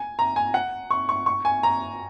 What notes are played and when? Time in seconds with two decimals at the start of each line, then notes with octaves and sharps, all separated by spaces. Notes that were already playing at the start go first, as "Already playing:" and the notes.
Already playing: G#5
0.19 A#5
0.36 G#5
0.54 F#5
0.91 C#6
1.09 C#6
1.26 C#6
1.45 G#5
1.63 A#5